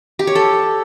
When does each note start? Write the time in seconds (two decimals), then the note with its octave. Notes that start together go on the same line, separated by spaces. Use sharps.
0.19 G4
0.27 C#5
0.35 A4